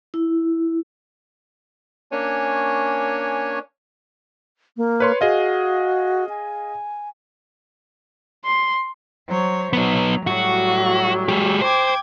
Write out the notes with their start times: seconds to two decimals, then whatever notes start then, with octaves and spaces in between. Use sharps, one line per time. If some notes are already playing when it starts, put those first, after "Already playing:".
0.14 E4
2.12 A#3 C#4 D4 C#5 G#5
4.77 A#3
5.00 B4 C#5 C6
5.21 F#4 G#4 D#5 F5
6.29 G#5
8.44 C6
9.27 F#3 C5 C#5
9.73 F#3 B3 D#4
10.27 A2 F#3 G3 F#4
11.28 G#3 G4
11.61 C5 G5 D6 G#6